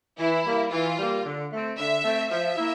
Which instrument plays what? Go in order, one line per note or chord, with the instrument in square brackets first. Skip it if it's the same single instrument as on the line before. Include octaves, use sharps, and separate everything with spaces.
[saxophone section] E3 [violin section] E4
[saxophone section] G3 A#3
[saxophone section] E3 [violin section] F4
[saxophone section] G3 A#3
D3
A3 C4
[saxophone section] D3 [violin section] E5
[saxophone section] A3 C4
[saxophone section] F3 [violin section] E5
[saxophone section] A#3 E4